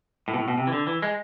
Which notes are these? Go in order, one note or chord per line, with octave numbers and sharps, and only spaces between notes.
A2
B2
A2
B2
C3
E3
D3
E3
G#3